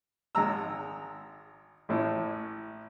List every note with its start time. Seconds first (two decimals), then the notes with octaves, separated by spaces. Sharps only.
0.35 G#1 G#3 A#5 E6
1.89 A1 A2